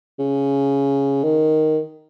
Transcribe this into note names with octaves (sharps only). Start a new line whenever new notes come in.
C#3
D#3